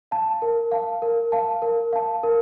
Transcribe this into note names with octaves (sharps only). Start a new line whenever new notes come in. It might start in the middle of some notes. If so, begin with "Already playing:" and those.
F5 A5
A#4
F5 A5
A#4
F5 A5
A#4
F5 A5
A#4